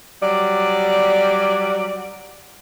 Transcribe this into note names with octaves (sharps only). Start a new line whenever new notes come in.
F#3 G3 D5